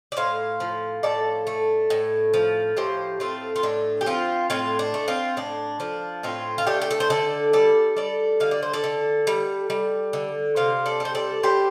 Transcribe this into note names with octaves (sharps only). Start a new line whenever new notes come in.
D5
A2 C5 F5
F3
A2 A4 D5
A3
A2
F3
A2 G4 C5
A3 C4 F4
F4
A2 D4
G4
F3 C4 F4
A2 C4 F4
D4
A3
C4 F4
A2 D4
F3 D4
A2 C4 F4
F4
A3 D4 G4
G4
A4
C5
D3 A4 D5
G3 A4 D5
G3 A4 D5
D3 F5
D5
C5
A4 D5
D3
G3
G3
D3
C3 C5 F5
A4 D5
G3 C5
A4 D5
G3 G4 C5